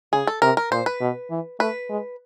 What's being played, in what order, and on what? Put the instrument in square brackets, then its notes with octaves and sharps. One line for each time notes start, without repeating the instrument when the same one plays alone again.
[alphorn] C#3 [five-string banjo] G#4
[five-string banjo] A4
[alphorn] C3 [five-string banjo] A#4
[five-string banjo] A#4
[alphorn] A#2 [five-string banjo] C5
[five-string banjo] B4
[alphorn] B2
E3
[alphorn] A3 [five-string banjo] B4
[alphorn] G#3